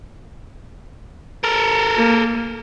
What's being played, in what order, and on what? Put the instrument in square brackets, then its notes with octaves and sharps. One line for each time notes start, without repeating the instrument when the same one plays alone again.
[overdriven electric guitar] A4 A#4
[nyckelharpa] A#3